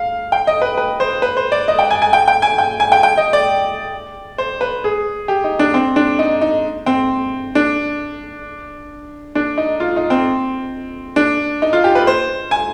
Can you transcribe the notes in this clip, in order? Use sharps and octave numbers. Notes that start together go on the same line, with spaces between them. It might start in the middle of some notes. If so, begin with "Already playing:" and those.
Already playing: F5
G5
D#5
B4
B4
C5
B4
C5
D5
D#5
G5
G#5
G#5
G5
G5
G#5
G5
G#5
G5
G5
D#5
D5
C5
B4
G#4
G4
D#4
D4
C4
D4
D#4
D#4
C4
D4
D4
D#4
F4
D#4
C4
D4
D#4
F4
G4
B4
C5
G#5